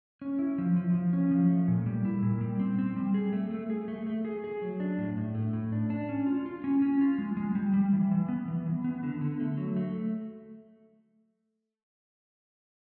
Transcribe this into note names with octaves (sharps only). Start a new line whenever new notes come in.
C#4
E4
F3
F3
F3
C#4
F3
A3
A#2
G3
E4
A#2
G3
C4
C4
G3
G#4
A3
A3
G#4
A3
A3
G#4
G#4
F#3
D4
A2
A2
A3
A2
D4
D4
C#4
F4
F4
C#4
C#4
F4
G#3
G#3
G3
G3
E3
E3
B3
E3
E3
B3
D3
D3
A3
F#3
A3